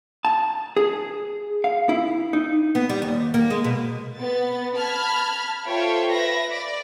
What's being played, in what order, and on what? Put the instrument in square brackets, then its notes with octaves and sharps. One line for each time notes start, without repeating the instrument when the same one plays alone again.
[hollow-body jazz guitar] A5
G#4
F5
E4
D#4
[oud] B3
G3
D#2
A#3
G#3
B2
[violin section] B3 A6
A5 B5 F6 G#6
F4 A4 C5 C#5 E5 G5
B4 E5 B5 A#6
D5